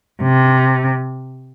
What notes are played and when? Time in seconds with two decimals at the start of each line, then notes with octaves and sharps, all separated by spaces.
0.22 C3